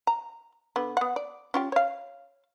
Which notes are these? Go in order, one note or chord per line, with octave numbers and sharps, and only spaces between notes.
A#5
D3 B3
B3 F#5
D5
C#4 F4 G4
C#5 F5